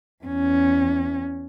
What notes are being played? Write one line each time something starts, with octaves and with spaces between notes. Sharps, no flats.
E2 C#4